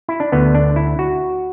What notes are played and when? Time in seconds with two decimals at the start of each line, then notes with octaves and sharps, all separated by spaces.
0.09 E4
0.20 D4
0.32 D2 D3 B3
0.55 D4
0.76 E4
0.99 F#4